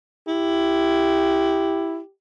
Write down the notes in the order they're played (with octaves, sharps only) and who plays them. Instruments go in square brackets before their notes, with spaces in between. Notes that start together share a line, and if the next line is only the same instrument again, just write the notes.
[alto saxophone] E4 [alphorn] G4